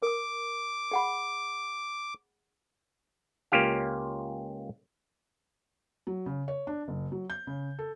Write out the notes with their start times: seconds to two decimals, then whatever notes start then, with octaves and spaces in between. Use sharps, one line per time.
0.02 A#4 D6 D#6
0.91 G#4 F#5 B5
3.52 C#2 A#3 C#4 F4 G4 F5
6.07 F#3
6.26 C#3
6.48 C#5
6.67 D4
6.88 F#1
7.12 F#3
7.30 G6
7.47 C#3
7.79 A4